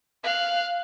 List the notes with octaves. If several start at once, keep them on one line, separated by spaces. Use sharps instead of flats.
F5 F#6